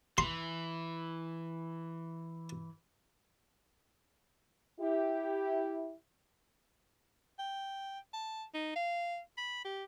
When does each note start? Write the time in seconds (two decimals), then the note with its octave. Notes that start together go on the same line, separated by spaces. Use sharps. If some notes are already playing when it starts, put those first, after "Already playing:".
0.18 E3 C6
4.80 E4 G4
7.39 G5
8.14 A5
8.54 D#4
8.76 F5
9.38 B5
9.65 G4